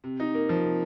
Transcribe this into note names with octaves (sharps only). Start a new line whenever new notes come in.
C3
D#4
A#3
F3
C3